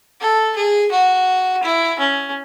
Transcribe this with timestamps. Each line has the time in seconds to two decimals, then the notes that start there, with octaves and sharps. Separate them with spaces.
0.21 A4
0.56 G#4
0.91 F#4
1.63 E4
1.99 C#4